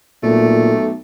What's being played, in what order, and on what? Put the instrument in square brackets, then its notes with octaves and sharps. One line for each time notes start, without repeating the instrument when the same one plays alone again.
[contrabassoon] B1 [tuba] A#2 [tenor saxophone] A3